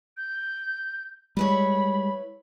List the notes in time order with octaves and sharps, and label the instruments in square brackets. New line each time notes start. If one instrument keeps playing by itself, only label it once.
[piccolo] G6
[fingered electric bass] G3 G#3 [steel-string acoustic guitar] E4 B4 C#5 [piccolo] B5